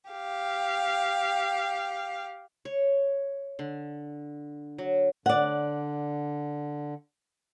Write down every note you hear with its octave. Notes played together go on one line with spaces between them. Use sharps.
G4 F5
C#5
D3
F#3
D3 D5 F#5